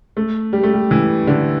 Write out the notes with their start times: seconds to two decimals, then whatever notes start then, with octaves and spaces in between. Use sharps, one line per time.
0.17 A3
0.53 G3
0.63 A3
0.74 G3
0.91 E3
1.27 D3